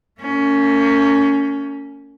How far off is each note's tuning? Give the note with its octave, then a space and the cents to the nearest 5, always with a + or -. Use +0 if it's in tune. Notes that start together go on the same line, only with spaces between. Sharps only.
A#3 -35 C#4 +15